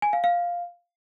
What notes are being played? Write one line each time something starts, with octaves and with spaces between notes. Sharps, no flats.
G#5
F5
F5